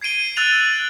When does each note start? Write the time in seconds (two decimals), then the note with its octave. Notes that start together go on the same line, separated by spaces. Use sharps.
0.01 G#6 C7 D7 D#7 G7
0.36 E6 F#6 A6 F7 F#7